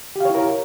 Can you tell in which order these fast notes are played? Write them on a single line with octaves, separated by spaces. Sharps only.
G4 F5 C#5 E4 A#4